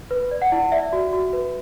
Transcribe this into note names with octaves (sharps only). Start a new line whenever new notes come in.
B4
D5
F#5
E4
D5 E5
F#4
F#4
B4